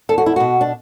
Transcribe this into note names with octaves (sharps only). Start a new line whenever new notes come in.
E2 A4
F#4
E4
B2 F#4
D4